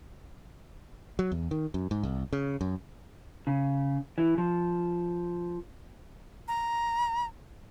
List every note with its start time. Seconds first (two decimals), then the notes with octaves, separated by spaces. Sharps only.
1.19 F#3
1.32 E2
1.51 D#3
1.74 F#2
1.91 G#2
2.03 C2
2.33 C#3
2.61 F#2
3.47 C#3
4.18 E3
4.38 F3
6.48 A#5